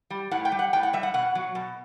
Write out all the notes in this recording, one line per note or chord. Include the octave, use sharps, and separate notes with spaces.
G3
A2 F#5
G5
G3
F#5
A2 G5
F#5
G3 E5
F#5
B2 F#5
F#3
B2